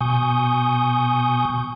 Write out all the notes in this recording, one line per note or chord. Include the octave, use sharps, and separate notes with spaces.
B2 G#5 C#6 D#6 G6